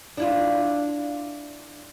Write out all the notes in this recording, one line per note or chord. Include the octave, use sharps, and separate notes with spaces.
D4 E4 F4